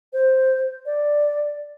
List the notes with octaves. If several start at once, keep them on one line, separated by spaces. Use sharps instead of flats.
C5
D5